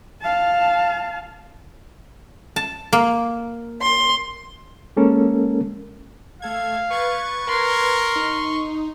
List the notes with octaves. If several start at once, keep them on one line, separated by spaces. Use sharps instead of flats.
F5 A5
A5
A#3
C6
G#3 A#3 C#4 A4 A#4
A3 A4 F5 G#6
B4 C#6 G#6 A6
A#4 C6
D#4